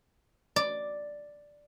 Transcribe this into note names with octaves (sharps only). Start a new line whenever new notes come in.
D5